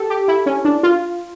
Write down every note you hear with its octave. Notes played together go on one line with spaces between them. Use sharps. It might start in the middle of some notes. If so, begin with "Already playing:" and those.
Already playing: G4 A4
G4
E4
C#4
D4
F4